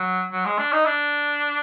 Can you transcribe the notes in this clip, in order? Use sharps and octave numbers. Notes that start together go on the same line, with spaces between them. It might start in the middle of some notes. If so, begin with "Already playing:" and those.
Already playing: F#3
F#3
G#3
D4
D#4
D4